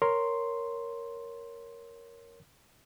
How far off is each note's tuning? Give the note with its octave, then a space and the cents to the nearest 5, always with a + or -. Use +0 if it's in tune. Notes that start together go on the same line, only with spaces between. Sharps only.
A#4 +0 C#5 +0 C6 +0